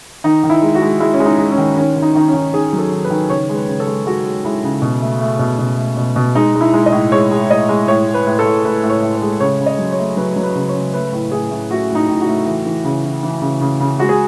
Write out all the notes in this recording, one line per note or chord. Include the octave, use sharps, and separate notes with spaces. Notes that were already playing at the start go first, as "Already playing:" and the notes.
D#3 D#4
D#3
E4
G#3
F#4
G#3
G#3 E4
C#4
G#3
D#4
G#3
C#4
D#3
D#3 C#4
D#3
D#4
D#3 D#4
C#4
D#3
D#3 G#4
F#3
A4
D#3
B4
D#3
C#3 C#5
G#3
B4
C#3
A4
G#3
G#3 F#4
G#3
G#3 E4
C#3
B2
A3
A3
B2
B2
A3
B2
B2
G#3 D#4
G#3
E4
G#3
D#5
A2
G#3 C#5
G#3
A2 D#5
G#3
A2 C#5
A2
B4
A2
A4
A2
A2 B4
A2
C#5
A2
C#5
G#3
C#3 C#5
C#3
D#5
F#3
C#5
A3
F#3 B4
F#3
B4
C#3
C#5
C#3
A3 B4
A2
A2 G#4
A2
A3 F#4
A2
D#4
A2
F#4
A3
E3
E3
C#3
E3
E3
C#3
C#3
C#3
G#3 F#4
G#4